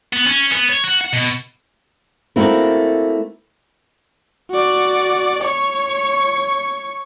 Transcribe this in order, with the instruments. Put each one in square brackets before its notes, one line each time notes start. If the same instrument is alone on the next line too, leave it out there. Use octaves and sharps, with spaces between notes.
[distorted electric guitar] B3
C#4
B3
C#5
F#4
F#5
B2
[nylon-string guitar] A3 A#3 C4 E4 F#4 A#4
[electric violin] F#4 D5
C#5 C#6